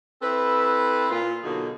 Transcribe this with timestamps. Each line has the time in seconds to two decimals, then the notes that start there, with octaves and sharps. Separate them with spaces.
0.22 C4 E4 A4 B4
1.11 A#2 F4
1.44 B2 D3 F#3 A#3 D#4 G#4